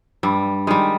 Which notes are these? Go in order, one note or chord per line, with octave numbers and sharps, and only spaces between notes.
G2 G3
D#3 G3 G#3